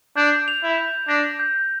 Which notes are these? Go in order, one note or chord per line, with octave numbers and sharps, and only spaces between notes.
D4 G6
F7
E4
G6
D4 A#6
G6